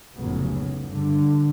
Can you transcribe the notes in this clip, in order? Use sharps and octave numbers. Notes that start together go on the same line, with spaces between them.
F1 C#2 A2 C#3 F#3 B3
G2 D3